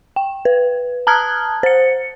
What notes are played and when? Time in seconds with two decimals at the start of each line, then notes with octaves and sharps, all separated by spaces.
0.16 G5
0.45 B4
1.07 A5 A#5 D#6 F6 F#6 G#6
1.63 C5 C#7